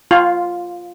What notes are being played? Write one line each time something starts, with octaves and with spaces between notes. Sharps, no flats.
F4